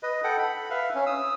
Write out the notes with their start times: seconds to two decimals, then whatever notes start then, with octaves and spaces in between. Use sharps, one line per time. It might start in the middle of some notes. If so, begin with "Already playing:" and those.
0.03 B4 D#5
0.24 A4 F#5 G5
0.38 B5
0.70 B4 E5 F5
0.95 C#4
1.06 D#6 E6